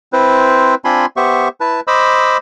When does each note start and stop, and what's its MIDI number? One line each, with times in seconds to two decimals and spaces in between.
0.13 0.75 60
0.13 0.75 64
0.13 0.75 71
0.13 0.75 72
0.85 1.06 60
0.85 1.06 62
0.85 1.06 65
0.85 1.06 80
0.85 1.06 83
0.85 1.06 84
1.17 1.48 59
1.17 1.48 67
1.17 1.48 72
1.17 1.48 76
1.17 1.48 85
1.60 1.80 64
1.60 1.80 71
1.60 1.80 81
1.87 2.37 72
1.87 2.37 75
1.87 2.37 83
1.87 2.37 86
1.87 2.37 88